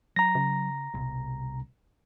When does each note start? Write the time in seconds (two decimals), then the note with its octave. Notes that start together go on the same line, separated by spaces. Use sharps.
0.16 F#3 A#5 A#6
0.35 C#3
0.94 D#1 C2 B2